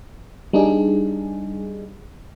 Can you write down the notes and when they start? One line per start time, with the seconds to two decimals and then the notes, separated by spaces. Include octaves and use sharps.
0.53 G3 D4 D#4 G#4